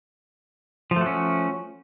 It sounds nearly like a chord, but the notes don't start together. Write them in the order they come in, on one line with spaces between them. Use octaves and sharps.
F3 A3 F#4 C#4